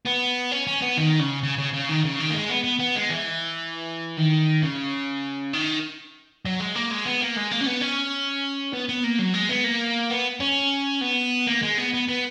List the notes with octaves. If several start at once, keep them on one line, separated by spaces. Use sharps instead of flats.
B3
C#4
C#4
B3
D#3
C#3
C#3
C#3
C#3
D#3
C#3
D#3
A#3
G#3
B3
B3
B3
G#3
E3
D#3
C#3
D#3
F#3
G#3
A#3
G#3
B3
A#3
G#3
A#3
C#4
B3
C#4
B3
B3
A#3
F#3
G#3
B3
A#3
B3
C#4
B3
A#3
G#3
B3
B3
B3